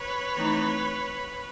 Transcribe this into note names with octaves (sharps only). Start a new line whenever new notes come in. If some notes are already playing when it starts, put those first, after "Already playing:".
Already playing: B4 C#5
E3 A3 C4 D#4